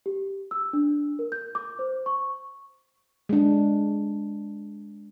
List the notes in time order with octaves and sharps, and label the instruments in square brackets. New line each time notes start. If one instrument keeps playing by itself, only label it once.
[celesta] G4
E6
D4
A#4
G6
D6
C5
C#6
[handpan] G#3 D4